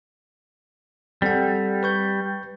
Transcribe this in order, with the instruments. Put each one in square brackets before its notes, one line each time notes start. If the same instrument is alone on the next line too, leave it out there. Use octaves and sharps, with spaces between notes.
[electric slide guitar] G3 [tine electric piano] C4 A4 F#5
[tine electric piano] B4 C#6 G6